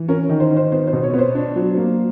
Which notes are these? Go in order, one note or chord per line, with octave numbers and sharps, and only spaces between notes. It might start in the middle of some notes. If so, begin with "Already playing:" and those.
Already playing: E3
C#4 A#4
D#3
C5
D#3
C5
B3 C5
C5
B2
C#5
B3
C5
D4
F#3
A#3